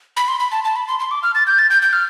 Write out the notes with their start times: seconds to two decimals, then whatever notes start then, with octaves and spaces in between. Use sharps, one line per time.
0.17 B5
0.28 C6
0.40 B5
0.52 A5
0.64 A5
0.76 B5
0.88 C6
0.99 C6
1.11 D6
1.23 F6
1.35 A6
1.47 G6
1.58 A6
1.70 G6
1.82 G6
1.93 F6